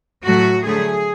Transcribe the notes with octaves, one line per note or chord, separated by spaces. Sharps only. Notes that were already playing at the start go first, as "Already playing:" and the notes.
A2 F#3 A3 F#4
D3 F#3 A3 G#4